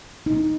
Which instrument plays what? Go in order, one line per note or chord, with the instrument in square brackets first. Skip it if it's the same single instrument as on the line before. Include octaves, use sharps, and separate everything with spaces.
[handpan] D#4